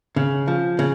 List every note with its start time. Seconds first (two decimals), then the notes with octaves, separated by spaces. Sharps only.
0.16 C#3
0.48 F3
0.79 C#3